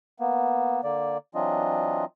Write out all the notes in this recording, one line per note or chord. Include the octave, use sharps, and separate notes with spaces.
A#3 B3
D3 A#3 D5
E3 F#3 C4 D4 F4 D#5